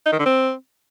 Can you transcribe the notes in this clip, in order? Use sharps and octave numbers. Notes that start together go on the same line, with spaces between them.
D#4
D#3
D3
C4